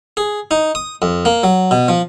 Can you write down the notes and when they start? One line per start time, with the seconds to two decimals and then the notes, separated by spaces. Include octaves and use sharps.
0.17 G#4
0.51 D#4
0.75 D#6
1.02 F2
1.25 A#3
1.43 F#3
1.71 B2
1.88 F3